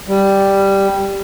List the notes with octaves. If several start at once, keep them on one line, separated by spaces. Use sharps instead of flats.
G3